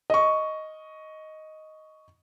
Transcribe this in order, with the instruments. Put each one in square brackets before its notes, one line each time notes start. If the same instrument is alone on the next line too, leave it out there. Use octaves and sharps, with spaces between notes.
[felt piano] D#5 C#6